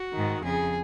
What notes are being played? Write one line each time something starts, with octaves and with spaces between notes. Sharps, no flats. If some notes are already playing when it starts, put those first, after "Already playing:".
Already playing: F#4
G#2 D#3
F2 C#3 G#4